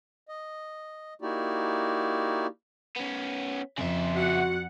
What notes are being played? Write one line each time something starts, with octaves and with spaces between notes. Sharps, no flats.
D#5
A#3 D#4 E4 F#4 G4 D5
B3 C#4
F2 C#3 E5
F#4 F#5